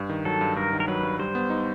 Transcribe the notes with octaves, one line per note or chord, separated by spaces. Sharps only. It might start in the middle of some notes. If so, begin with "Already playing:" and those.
Already playing: G2
D#3
F#3 A4
G2
G2 A#4
D#3
A#4
F#3 B4
G2
G3 C5
B3
D#4